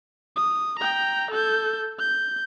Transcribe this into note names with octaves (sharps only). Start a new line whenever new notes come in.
D#6
G5 A#5
A4 G6
G6